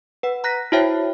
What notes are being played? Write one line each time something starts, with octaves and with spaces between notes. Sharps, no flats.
B4 F#5
A#5 F#6 A#6 B6
E4 F#4 C5 C#5 E5 G5